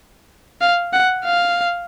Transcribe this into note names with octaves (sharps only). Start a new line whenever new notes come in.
F5
F#5
F5